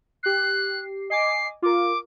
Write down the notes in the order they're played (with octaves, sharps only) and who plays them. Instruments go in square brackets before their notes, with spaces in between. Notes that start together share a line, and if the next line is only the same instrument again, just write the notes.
[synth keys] G4 C7 [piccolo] F#6
[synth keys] D#5 G#5 D6 [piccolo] C7
[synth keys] F4 A#4 [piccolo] D6